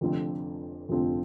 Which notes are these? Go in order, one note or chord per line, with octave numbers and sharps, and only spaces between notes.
F1 F2 D3 F3 C4
F1 F2 D3 F3 C4